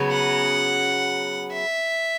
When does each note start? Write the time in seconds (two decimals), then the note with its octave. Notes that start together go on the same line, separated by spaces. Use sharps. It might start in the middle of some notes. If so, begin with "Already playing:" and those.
Already playing: C#3 F#3 B3
0.12 F#5
1.53 E5